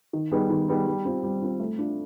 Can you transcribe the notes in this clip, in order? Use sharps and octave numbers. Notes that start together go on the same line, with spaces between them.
D#3
G3 B3 D#4 G#4
D#3
G3 B3 D#4 G#4
G3
C4 F4
G3
C4 F4
A3
D4 F4